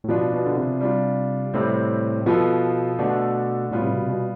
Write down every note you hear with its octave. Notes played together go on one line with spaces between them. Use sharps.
A2
B2 F3 B3 D4 F4
B2
D3
C3
G3 D4 F4
A2 C3 G3 C4
B2 F3 B3 F4 A4
B2 D3 A3 D4
A2 G3 B3 F4
C3
B2
C3
B2